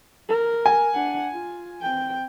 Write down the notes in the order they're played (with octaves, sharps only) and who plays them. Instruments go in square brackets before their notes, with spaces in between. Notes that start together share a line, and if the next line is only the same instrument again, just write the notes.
[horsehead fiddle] A#4
[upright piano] G#5
[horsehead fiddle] D4 F#5
F4
C4 G5